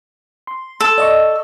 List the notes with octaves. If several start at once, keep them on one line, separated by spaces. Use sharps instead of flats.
C6
A4
D5 D#5 C#6